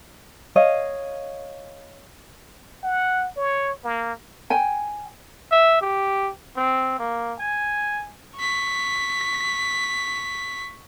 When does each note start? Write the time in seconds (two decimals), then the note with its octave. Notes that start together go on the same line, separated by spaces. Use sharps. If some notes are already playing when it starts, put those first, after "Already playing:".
0.56 C#5 D#5 F5
2.84 F#5
3.37 C#5
3.84 A#3
4.50 G5 G#5
5.51 E5
5.81 G4
6.57 C4
6.99 A#3
7.39 G#5
8.36 C#6 B6